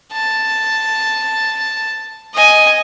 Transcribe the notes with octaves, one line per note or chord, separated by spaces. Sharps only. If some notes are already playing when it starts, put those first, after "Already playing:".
A5
D#5 G#5